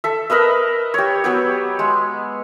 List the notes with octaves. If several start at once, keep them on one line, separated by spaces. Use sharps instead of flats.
A4 E5
A#4 B4 D#5 E5
G4 C#5
F#3 B3 G4
G#3